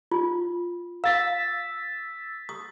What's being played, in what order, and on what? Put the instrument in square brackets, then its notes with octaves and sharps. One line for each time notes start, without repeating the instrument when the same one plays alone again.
[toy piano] F4
[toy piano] F5 [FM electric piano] E6 A6 B6
[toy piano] D#6